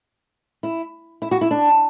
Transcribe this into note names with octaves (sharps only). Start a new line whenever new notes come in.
E4
E4
F#4
E4
D4